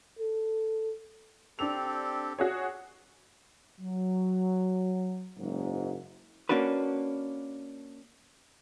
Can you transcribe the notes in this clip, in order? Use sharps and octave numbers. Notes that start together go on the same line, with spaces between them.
A4
C4 D4 G4 A4 F7
F#4 G#4 C#5
F#3
F#1 G#2
A#3 C#4 D4 F#4 B4